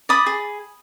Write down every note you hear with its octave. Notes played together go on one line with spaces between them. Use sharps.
D5 B5 D#6
G#4